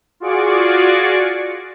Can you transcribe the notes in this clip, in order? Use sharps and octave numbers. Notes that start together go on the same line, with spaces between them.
F4 F#4 G#4 D5 C#6 D6